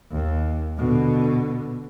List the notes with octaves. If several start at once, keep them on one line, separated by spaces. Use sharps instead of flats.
D#2
B2 D3